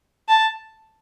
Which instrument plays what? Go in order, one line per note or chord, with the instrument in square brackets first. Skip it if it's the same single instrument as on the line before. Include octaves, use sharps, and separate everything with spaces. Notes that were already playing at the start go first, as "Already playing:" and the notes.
[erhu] A5